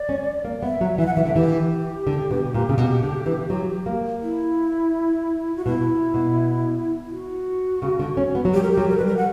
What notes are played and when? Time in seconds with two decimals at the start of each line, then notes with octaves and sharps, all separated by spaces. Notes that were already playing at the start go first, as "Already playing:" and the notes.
Already playing: D5
0.09 C#4
0.45 A#3
0.63 B3 E5
0.81 F#3
0.98 E3 E5
1.06 F#5
1.14 E3 E5
1.26 D3
1.35 E3 G4
2.07 D3
2.31 B2
2.54 A#2
2.69 C#3
2.78 B2
3.03 D3
3.26 E3
3.50 F#3
3.86 A#3
4.22 E4
5.56 F#4
5.65 B2 E4
6.14 B2
7.10 F#4
7.82 C#3
7.99 D3
8.17 C#4
8.35 B3
8.45 F#3
8.54 G3 G4
8.63 A#4
8.72 G4
8.77 F#3
8.89 A#4
8.98 G3 B4
9.06 A#4
9.17 F#5